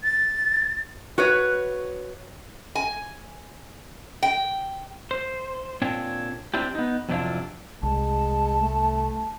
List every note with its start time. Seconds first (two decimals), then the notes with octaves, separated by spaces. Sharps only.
0.03 A6
1.18 F#4 B4 C#5
2.75 G#5
4.23 G5
5.11 C5
5.82 A#2 C4 D4 C#5
6.54 C4 D4 E4 G4
6.75 B3 D#4
7.09 F2 C3 F#3 D4 E4 F4
7.83 C2 G#3 A5
8.60 A3